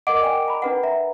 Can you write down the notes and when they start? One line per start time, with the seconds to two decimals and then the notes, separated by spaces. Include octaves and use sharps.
0.07 A#4 D#5 F#5 D6 D7
0.22 D5 G5 G#5
0.48 A#5 B5
0.62 D4 B4 F#5
0.83 E5 A#5